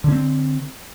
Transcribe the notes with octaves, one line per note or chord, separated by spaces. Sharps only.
D3 C4 C#4